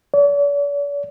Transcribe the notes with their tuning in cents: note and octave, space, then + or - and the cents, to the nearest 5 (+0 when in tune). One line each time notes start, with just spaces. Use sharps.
D5 -45